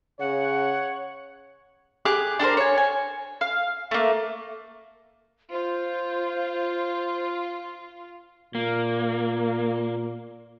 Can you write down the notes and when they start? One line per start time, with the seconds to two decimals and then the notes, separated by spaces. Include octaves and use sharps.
0.20 C#3 C#5 F#5
2.05 G4 G#4 D6 F#6
2.39 D4 A4 A#4 C5
2.57 C#5 G#5
2.77 G#5
3.41 F5
3.91 A3 A#3
5.51 F4 C5
8.55 A#2 A#3